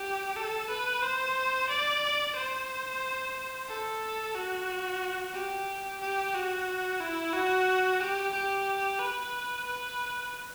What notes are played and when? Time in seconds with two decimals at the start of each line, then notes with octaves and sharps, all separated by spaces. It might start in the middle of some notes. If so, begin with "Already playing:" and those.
Already playing: G4
0.36 A4
0.69 B4
1.03 C5
1.69 D5
2.35 C5
3.68 A4
4.35 F#4
5.34 G4
6.00 G4
6.34 F#4
7.00 E4
7.33 F#4
8.00 G4
8.33 G4
9.00 B4
9.66 B4